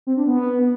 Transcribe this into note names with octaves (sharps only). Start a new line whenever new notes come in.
C4
D4
B3